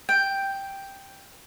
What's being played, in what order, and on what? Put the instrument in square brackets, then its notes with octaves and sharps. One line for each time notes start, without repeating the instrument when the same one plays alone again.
[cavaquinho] G5